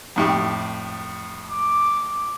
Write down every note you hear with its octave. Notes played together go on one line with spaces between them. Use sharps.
F2 A2 G4
D6